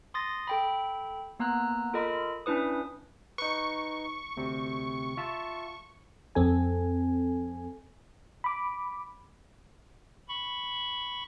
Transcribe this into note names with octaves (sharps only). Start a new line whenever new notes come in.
C6 D#6 A6 A#6
A4 G5 B5
A#3 B3 A#5 E6 F#6
F4 A4 A#4 D#5 B5
C#4 D4 E4 B4 D#6
D#4 B4 C#6
D2 C3
F4 E5 A5
F2 C4 A4 G#5
B5 D6
B5 C#6